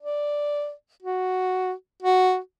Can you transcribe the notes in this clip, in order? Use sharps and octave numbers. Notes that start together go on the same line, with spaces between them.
D5
F#4
F#4